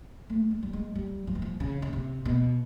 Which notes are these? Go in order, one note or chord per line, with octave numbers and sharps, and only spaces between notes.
A3
G#3
G3
G#3
G3
F3
E3
F3
C#3
C#3
C3
B2